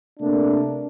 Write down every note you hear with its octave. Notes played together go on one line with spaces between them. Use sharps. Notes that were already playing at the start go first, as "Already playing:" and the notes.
C3 A3 A#3 D4